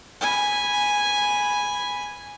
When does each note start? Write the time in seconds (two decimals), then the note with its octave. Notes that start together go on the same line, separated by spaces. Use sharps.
0.21 G#5 B5